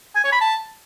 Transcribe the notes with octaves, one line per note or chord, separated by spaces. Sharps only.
G#5
C#5
B5
A5